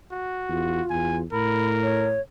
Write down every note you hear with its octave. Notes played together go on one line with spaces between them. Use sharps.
F#4
E2 F4
E2 G#5
A2 A#4 B5
C#5